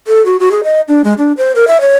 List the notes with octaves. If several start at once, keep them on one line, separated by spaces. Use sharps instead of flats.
A4
F#4
F#4
G#4
D#5
D4
G#3
D4
C5
A#4
E5
C#5